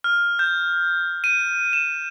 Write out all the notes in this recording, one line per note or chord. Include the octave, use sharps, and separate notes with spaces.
F6
G6
D#7
E7